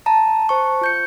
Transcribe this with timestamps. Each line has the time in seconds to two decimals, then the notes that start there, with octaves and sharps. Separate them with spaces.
0.06 A5 A#5
0.49 C5 A5 C#6
0.81 F4 G6 C#7